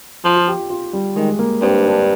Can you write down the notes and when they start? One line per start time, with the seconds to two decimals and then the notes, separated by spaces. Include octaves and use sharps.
0.25 F3 F4
0.36 F4
0.48 G4
0.70 F4
0.93 G3
1.16 D#3 G#3
1.39 A#3
1.62 G2 C4
1.86 D4